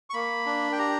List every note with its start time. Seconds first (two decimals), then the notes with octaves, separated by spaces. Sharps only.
0.10 C#6
0.14 A#3 B5
0.46 D4
0.72 G5
0.79 G4 A#5